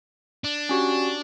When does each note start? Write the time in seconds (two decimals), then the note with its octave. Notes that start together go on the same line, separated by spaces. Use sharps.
0.44 D4
0.69 C#4 F#4 G4